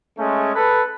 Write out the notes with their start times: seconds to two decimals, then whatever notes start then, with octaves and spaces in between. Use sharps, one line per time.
0.18 G#3 A3 C#4
0.55 A4 B4